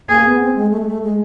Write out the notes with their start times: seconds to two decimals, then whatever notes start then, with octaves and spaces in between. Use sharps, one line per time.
0.09 A#3 G#4
0.25 B3
0.40 C4
0.55 G#3
0.71 A3
0.80 G#3
0.87 A3
1.02 G#3